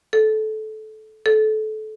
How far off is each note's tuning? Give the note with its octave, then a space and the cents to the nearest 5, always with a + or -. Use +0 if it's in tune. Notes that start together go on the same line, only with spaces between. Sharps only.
A4 -20
A4 -25